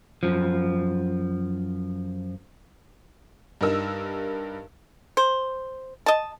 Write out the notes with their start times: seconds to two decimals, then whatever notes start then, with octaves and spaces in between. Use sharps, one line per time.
0.23 F#2 F3
3.61 G2 D#4 A#4 E6
5.17 C5
6.06 D#5 A5